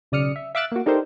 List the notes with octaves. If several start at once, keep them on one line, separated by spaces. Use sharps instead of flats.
B1 C#3 D5 D#6 F6 C#7
E5
E5 F5 D6 E6 F#6 A6
A#3 F#4
D4 D#4 G4 A4 A#4 C5